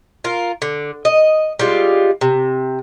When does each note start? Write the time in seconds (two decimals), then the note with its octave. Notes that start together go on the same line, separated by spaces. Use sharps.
0.24 F4 A#4
0.62 D3
1.05 D#5
1.59 G3 G#3 F4
2.21 C3